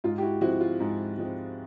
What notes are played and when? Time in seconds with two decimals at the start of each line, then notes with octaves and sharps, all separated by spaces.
0.04 G#2 F4
0.18 G4
0.22 E4 F#4
0.41 F3 G#3 C4 E4 F#4
0.61 F4
0.80 G#2
1.18 F3 G#3 C4